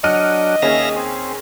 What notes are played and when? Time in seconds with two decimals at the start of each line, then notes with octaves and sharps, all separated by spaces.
0.04 F#3 D4 D#5 F#5 F6 D#7
0.62 D#2 C#4 G#4 E5 F5 A#6
0.96 C4